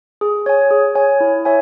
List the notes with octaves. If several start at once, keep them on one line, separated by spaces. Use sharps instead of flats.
G#4
C#5 G#5
G#4
C#5 G#5
E4
C#5 E5 G#5